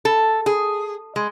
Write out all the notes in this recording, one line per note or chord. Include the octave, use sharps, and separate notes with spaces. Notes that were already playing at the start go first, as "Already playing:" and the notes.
A4
G#4
G#3